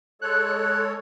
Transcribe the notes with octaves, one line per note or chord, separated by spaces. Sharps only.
G#3 A4 C#5 F#6